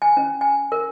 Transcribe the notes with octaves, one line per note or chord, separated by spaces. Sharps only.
G#5
C#4
G#5
A#4